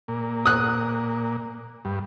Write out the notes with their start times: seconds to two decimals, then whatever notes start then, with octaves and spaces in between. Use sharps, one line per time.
0.08 A#2
0.46 D#6 F#6
1.85 G2